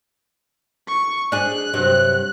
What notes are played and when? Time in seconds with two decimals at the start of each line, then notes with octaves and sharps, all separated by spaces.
0.88 C#6
1.32 D4 G#4 F#6
1.74 G2 C3 F#3